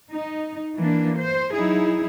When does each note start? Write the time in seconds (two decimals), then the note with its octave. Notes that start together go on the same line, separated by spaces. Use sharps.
0.11 D#4
0.78 E3 A#3 D4
1.18 C5
1.54 F#3 D#4 E4 G#4